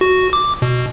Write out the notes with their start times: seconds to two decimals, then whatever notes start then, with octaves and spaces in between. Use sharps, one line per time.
0.01 F#4
0.33 D6
0.62 B2